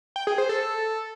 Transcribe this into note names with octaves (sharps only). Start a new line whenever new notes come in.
G5
G#4
C5
A4